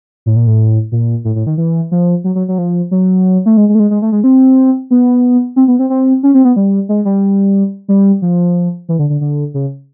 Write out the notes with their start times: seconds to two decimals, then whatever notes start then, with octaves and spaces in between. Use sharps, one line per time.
0.26 A2
0.36 A#2
0.47 A2
0.92 A#2
1.25 A2
1.35 A2
1.47 D#3
1.58 E3
1.92 F3
2.24 F#3
2.35 F#3
2.48 F#3
2.58 F3
2.91 F#3
3.46 A3
3.57 G#3
3.69 G#3
3.75 A3
3.80 G#3
3.91 G#3
4.02 A3
4.12 G#3
4.24 C4
4.91 B3
5.56 C4
5.68 B3
5.79 C4
5.90 C4
6.23 C#4
6.34 C4
6.45 B3
6.56 G3
6.89 G#3
7.05 G3
7.89 G3
8.22 F3
8.89 E3
8.99 D3
9.10 D3
9.21 D3
9.54 C#3